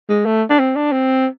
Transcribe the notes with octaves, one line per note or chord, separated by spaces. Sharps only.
G#3
A3
D4
C4
D4
C4